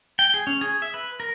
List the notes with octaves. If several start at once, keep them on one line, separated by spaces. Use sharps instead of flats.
G5
G#4
C#4
G#4
E5
B4
A#4